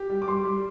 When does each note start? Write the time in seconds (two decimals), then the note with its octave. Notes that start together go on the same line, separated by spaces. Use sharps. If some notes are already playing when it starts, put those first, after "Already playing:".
Already playing: G4
0.10 G3
0.22 D6
0.27 G3 C6
0.45 G3